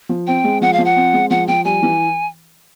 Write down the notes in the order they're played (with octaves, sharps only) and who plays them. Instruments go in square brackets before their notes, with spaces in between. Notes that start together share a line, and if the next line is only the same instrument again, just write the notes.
[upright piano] F3
[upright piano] C4 [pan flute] G5
[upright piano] G#3
[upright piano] F3 [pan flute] F#5
[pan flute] F5
[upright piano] F3
[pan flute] F#5
[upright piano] C4
G#3
[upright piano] F3 [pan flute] F#5
[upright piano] F3 [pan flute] G5
[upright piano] G3 [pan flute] G#5
[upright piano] E3